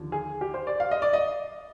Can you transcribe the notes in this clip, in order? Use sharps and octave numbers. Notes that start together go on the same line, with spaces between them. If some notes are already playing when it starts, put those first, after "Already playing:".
Already playing: D#2 D3 F3
G#4
G4
C5
D5
F5
D#5
D5
D#5